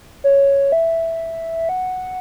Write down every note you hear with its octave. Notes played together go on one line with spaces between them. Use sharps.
C#5
E5
F#5